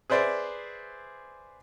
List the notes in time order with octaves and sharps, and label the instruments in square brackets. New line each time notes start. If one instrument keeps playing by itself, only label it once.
[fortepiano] G#4 B4 C5 D5 E5